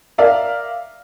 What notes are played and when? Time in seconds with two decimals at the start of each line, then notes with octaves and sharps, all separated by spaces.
0.18 A#4 D5 E5 F5